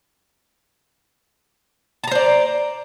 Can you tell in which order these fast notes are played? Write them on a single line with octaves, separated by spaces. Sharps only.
A5 A#5 C5 D5